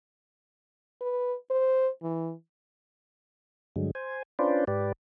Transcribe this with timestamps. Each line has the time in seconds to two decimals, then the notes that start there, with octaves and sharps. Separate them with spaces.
1.01 B4
1.50 C5
2.03 E3
3.76 G2 D3 F#3 G#3
3.95 C5 G#5
4.39 C#4 D4 F4 B4 C5 D5
4.67 G#2 G4 B4 D5